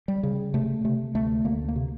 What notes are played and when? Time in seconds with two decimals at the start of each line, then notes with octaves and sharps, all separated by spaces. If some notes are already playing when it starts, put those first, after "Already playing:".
0.08 G3
0.23 C#3
0.54 C3 A3
0.84 C3 A3
1.15 D2 A3
1.45 D2 A#3
1.68 A#3
1.76 C3